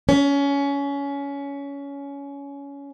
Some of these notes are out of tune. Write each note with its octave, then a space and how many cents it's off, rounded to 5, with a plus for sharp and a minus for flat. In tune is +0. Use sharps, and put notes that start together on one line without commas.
C#4 +20